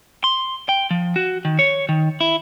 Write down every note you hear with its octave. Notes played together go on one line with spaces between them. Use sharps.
C6
G5
F3
F#4
D#3
C#5
D#3
E4